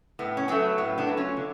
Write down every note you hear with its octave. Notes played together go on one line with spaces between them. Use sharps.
A2 B3
C#4
F#3 A3 B3
A2 B3
B3 D4
F#3 A3
C#4 F4
D3